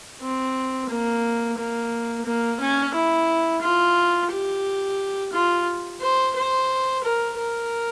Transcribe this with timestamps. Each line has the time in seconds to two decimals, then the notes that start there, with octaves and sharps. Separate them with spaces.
0.22 C4
0.89 A#3
1.58 A#3
2.25 A#3
2.60 C#4
2.94 E4
3.62 F4
4.31 G4
5.34 F4
6.01 C5
6.36 C5
7.04 A#4
7.38 A#4